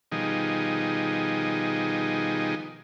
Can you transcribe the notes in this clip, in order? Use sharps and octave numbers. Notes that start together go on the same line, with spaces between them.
B2 D#3 F3 G3 D#4 G#4